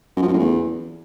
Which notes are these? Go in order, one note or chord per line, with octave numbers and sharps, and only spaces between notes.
F#2
F3
F#2
A2
E2